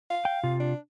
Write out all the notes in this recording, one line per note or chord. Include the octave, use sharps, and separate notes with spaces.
F5
G5
C3 F4
D4